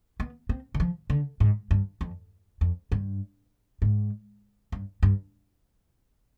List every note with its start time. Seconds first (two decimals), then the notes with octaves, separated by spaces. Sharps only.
0.20 B3
0.49 C4
0.74 D#3
0.80 F3
1.10 D3
1.40 G#2
1.71 G2
2.01 F2
2.61 F2
2.92 G2
3.82 G#2
4.72 G2
5.03 G2